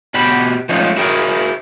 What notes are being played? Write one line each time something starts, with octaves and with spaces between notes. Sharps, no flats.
B2 F#4 G4 B5
F3 G#3 A3 C4 C#4 D#4
E4 F#4 G#4 A#4 G5